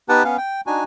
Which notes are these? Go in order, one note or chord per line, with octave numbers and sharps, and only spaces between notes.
B3 D#4 G4 B4 F#5 A5
B3 C#4 F5
G5
D4 D#4 F#4 G#5